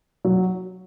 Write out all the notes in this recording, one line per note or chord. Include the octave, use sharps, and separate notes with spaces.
F#3